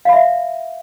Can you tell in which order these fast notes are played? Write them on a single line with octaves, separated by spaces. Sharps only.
F5 B5 E5